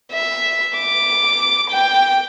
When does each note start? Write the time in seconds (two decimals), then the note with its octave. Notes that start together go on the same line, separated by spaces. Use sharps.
0.12 E5
0.78 D6
1.70 G5